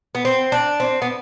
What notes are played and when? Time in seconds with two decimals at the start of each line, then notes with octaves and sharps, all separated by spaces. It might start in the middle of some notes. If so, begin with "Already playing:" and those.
0.15 B3
0.25 C4
0.52 D4
0.80 C4
1.02 B3